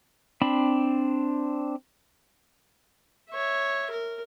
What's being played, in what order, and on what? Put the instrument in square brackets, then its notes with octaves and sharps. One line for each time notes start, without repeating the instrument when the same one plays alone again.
[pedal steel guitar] C4 D4 B5
[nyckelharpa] C#5 E5
A#4